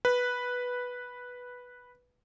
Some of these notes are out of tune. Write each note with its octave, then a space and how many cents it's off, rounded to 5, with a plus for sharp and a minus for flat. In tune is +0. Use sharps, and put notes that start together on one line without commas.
B4 -5